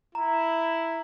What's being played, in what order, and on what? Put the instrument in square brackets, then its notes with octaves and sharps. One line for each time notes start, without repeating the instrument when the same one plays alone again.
[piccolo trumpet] E4 [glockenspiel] A#5